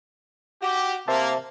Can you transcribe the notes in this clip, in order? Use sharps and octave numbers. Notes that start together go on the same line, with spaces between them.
F#4 G4
C3 A#3 C5 E5 A5